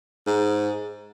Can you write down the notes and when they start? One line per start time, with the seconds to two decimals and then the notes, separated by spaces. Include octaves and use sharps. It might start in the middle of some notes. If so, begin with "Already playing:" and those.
0.27 G#2